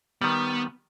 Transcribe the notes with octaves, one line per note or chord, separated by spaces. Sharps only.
D#3 G3 B3